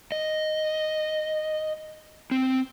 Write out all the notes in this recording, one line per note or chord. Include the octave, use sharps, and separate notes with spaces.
D#5
C4